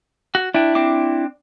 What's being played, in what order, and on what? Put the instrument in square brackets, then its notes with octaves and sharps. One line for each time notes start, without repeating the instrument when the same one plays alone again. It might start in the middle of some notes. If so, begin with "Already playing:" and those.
[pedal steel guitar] F#4
[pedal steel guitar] D4 [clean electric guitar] E4 G5
[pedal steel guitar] C4 D4 D6